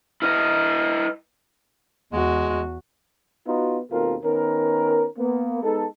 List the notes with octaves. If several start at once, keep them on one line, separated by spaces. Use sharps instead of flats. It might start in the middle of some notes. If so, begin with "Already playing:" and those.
E4 B4 D#5 F6
E2 G#3 F#4
B3 D#4 F4 F#4
D#2 B2 C4 F4 A4 A#4
D#3 B3 C#4 A#4
A#3 B3
G#3 B3 D#4 A4